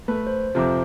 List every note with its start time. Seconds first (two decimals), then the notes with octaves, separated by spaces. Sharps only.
0.08 A3 B4
0.27 C5
0.55 F2 C3 F3 C5 A#5 D6